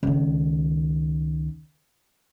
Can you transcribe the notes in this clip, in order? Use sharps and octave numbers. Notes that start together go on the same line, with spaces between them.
C#2 D#3